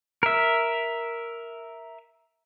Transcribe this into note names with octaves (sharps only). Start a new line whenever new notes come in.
A#4 E5